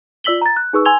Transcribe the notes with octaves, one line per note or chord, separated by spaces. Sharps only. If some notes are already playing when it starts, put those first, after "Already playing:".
F4 D5 E6 B6 F#7 G7
A#5 A6
F#6
D#4 G#4 B4 C#6 E6
G#5 C6 E6 G#6 F7 G7